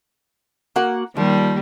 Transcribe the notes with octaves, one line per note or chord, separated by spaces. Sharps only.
A#3 F#4 F#5
D#3 F3 G3 A#3